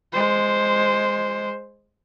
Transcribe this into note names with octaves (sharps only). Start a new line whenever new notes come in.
G#3 C5